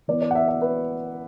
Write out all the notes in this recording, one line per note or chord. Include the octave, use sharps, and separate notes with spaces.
E3 B3 E4 D5
D5
F#5
E5
E5
B4